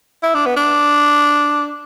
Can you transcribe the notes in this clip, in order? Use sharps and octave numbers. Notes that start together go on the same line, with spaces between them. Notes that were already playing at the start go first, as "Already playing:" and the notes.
E4
D4
B3
D4